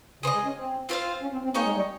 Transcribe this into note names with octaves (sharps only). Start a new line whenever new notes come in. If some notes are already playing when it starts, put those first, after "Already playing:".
C#3 G#4 C5 D#5
G#3
C#4
C4
C4 F4 C5 F5
C#4
C4
C4
A#3 D#4 G#4 C#5 G5
G#3
G3